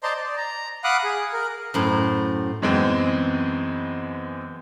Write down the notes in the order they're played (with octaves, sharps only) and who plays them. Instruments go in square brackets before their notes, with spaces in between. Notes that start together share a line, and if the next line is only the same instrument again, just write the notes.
[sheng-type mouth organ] C5 D5 D#5 A5 A#5 C6
D5
A#5
F5 F#5 B5 D6 D#6 F#6
G#4
A#4
[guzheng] F#2 A2 C5
[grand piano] F#2 E3 G#3 B3 C4